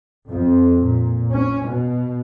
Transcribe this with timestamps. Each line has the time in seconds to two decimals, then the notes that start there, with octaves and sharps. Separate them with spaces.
0.28 F2
0.79 A#2
1.32 C#4
1.66 B2